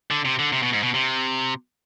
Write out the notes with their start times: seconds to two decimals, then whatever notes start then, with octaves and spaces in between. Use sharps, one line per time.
0.11 D3
0.25 C3
0.39 D3
0.52 C3
0.63 B2
0.73 G#2
0.83 B2
0.94 C3